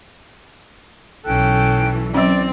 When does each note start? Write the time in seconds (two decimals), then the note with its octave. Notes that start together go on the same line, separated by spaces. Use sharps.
1.25 B1 E3 C#4 A4 G5 F#6
2.14 F#3 C4 C#4 D5